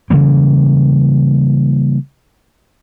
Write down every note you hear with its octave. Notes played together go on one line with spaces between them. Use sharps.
C#3 E3 G3 A#3